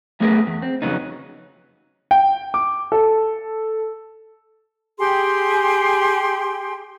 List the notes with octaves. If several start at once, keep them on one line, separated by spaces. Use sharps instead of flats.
F#2 A3 B3 G#4 A#4 B4
E2
C4
F2 A#2 C#3 F#3 B3 D#4
G5
D6
A4
G4 G#4 G5 C6